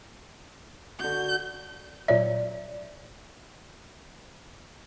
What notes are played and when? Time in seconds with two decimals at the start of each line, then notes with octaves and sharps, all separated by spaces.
1.00 D3 F#4 G6
2.08 A#2 F#3 D5 E5